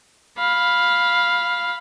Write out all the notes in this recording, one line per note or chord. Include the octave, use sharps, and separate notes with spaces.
F5 B5